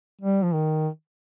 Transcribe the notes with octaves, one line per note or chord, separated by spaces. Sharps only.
G3
F3
D#3